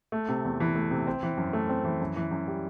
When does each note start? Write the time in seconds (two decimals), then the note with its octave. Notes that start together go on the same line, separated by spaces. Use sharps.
0.12 A3
0.29 C3
0.45 E2
0.60 E3
0.76 A3
0.91 C3
1.07 C4
1.23 E3
1.37 F#2
1.53 A3
1.69 C4
1.84 E3
2.00 F#2
2.16 E3
2.31 F#2
2.48 G3